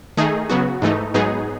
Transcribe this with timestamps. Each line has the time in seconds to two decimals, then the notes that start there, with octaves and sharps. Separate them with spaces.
0.17 D#3 A3 D#4 G#4
0.49 C#3 F#3 B3 F#4
0.82 G#2 E3 A3 D#4
1.14 G#2 F#3 B3 D#4 G#4